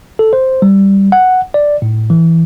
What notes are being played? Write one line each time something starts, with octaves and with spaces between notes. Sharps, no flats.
A4
C5
G3
F#5
D5
A2
E3